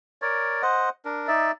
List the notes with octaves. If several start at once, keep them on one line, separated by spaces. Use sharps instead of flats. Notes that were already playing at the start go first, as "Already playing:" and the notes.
A#4 C#5 D5
C5 D#5 F#5
D4 A#4
D#4 D5 E5